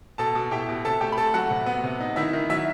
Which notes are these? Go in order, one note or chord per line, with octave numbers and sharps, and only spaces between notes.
B2 A4 A5
B2
E4 G4 G5
B2
C3 A4 A5
A3 G4 G5
B5
A3 A4 A5
F#3 F#4 F#5
C3
B3
C3
D#4
D#3 E4 E5
D#3
F#3 E4 E5